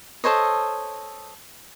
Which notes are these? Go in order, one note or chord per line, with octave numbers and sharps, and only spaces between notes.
A4 C5 C#5 D#5